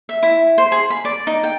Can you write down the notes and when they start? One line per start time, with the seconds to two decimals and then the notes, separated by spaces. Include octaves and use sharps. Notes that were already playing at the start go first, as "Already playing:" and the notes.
0.09 E5
0.23 E4
0.58 C5
0.72 G#4
0.90 B5
1.05 D5
1.27 D#4
1.43 G5